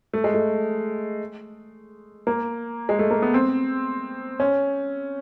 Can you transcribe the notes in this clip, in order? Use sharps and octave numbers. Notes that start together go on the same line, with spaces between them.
A3
G#3
A3
A#3
G#3
A3
A#3
B3
C4
C#4